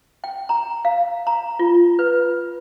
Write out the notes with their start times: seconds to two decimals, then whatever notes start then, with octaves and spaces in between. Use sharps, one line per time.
0.24 G5
0.49 A#5
0.85 F5
1.27 A#5
1.59 F4
1.99 B4